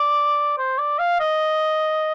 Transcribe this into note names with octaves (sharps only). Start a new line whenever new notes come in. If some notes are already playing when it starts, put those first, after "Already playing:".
Already playing: D5
C5
D5
F5
D#5